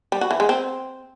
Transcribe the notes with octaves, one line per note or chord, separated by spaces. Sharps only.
G3
F#4
E3
G#3
C4